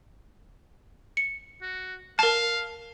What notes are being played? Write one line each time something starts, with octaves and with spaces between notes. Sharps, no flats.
C#7
F#4
A#4 F5 A5